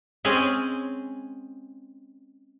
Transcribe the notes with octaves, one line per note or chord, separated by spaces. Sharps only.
G#3 C4 C#4 G#4